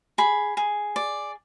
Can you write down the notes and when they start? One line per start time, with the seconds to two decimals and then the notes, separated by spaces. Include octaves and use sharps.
0.18 G#4 B5
0.57 G#4
0.96 D5